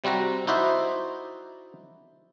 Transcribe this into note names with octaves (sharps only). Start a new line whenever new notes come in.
C3 G3 C4 F#4 A#5
D#4 E4 F#4 C5 D5 E5